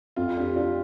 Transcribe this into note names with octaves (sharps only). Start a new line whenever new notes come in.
F2 F4
D4 G4
D4 F4